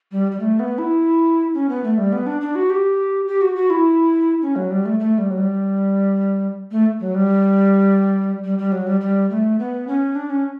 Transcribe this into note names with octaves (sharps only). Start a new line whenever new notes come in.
G3
G3
A3
B3
E4
C#4
B3
A3
G3
B3
D4
D4
F#4
G4
G4
F#4
F#4
E4
C#4
F#3
G3
A3
A3
G3
F#3
G3
A3
F#3
G3
G3
G3
F#3
G3
G3
A3
B3
C#4
D4
C#4